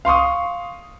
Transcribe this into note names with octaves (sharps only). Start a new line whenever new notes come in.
F5 C6 C#6 D#6